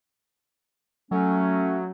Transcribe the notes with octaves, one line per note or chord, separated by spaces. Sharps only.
F#3 A3 C#4